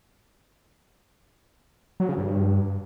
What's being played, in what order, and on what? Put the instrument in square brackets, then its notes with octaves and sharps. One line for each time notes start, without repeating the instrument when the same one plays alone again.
[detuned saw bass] F#3
C#3
G2